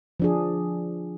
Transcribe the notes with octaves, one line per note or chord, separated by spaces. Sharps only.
F3 D4 G#4